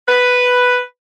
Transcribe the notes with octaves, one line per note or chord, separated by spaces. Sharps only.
B4